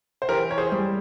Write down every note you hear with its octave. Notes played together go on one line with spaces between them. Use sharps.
C5
E3 G4 A#4
C#5
G#4 C5
G3